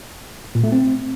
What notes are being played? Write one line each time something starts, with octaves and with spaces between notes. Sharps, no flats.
A#2
A3
C4